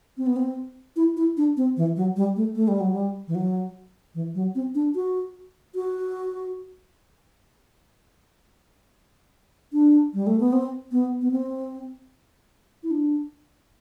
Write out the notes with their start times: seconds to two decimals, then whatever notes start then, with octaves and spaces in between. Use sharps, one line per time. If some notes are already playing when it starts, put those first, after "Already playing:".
0.17 C4
0.26 B3
0.36 C4
0.96 E4
1.17 E4
1.37 D4
1.57 C4
1.77 E3
1.96 F#3
2.16 G3
2.36 A3
2.55 A3
2.68 G3
2.80 F#3
2.92 G3
3.28 E3
3.35 F#3
4.15 E3
4.35 F#3
4.55 C4
4.75 D4
4.95 F#4
5.75 F#4
9.73 D4
10.14 G3
10.27 A3
10.40 B3
10.53 C4
10.92 B3
11.22 B3
11.32 C4
12.83 E4
12.91 D4